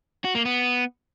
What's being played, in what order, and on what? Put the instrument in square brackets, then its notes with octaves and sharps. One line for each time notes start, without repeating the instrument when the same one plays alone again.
[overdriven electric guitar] F#4
A#3
B3